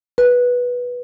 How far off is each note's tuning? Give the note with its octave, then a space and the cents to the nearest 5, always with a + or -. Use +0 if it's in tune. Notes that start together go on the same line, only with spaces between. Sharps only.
B4 -10